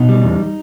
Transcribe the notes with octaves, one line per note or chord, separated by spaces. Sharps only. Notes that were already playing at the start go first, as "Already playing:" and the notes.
Already playing: B2 D#4
G3
E2